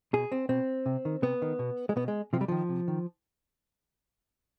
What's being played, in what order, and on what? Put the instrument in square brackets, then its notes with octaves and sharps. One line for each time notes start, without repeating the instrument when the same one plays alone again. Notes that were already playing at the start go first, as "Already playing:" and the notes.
[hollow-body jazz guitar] B2 G#4
C4
B2 C4
C3
D#3
C3 B3
D#3
B2
G#3
B2 B3
G#3
C3 F3
G3
D#3 F3
C3
D#3